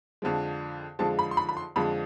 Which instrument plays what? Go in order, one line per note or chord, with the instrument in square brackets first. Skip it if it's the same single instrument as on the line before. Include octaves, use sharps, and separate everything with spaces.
[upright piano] F2 D3 F3 G#3
F2 D3 F3 G#3 A5
B5
C6
B5
B5
C6
F2 D3 F3 G#3 B5